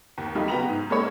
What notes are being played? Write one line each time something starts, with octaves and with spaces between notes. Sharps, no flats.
D#2
F#3 G3 A3 D#4 F4
C#3 B3 F#4 G5 A#5 F7
G#2
G#3 A#3 C#4 G#4 A4 C#5